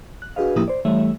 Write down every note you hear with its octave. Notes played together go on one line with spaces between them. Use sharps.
F#6
D4 F#4 G#4 B4 D#5 F5
A2 F3 A#3 E4 G4 D#6
C5 D5
E3 G3 A3 C#5 E5